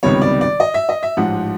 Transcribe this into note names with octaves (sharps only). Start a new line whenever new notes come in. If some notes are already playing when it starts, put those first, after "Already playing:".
C#2 C3 D#3 G3 B3 C#5
D5
D5
D#5
E5
D#5
E5
A1 G#2 F3 F#5